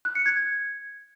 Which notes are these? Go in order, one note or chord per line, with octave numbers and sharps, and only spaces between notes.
F#6
C#7
G#6